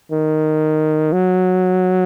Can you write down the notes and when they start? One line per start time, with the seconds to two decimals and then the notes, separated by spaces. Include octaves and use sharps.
0.12 D#3
1.13 F#3